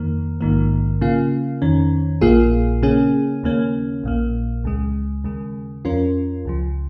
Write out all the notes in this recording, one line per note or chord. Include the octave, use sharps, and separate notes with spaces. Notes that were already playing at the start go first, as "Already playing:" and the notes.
Already playing: F2 D#3 A#3
A#1 G#2 D#3 A#3
C#3 A#3 F4
F2 D#3 C#4
A#1 A#2 A#3 F4 G#4
C#3 A#3 C#4 G#4
D#2 C#3 A#3 C#4
A#1 A#2 A#3
C#2 C#3 G#3
D#2 C#3 G#3
F2 F3 C#4 F4 A#4
C#2 C#3 F3